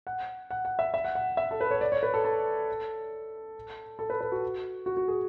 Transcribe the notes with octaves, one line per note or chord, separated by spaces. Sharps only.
F#5
F#5
F#5
E5
E5
F#5
F#5
E5
A4
B4
C#5
D5
C#5
B4
A4
A4
A4
B4
B4
F#4
F#4
F#4
G#4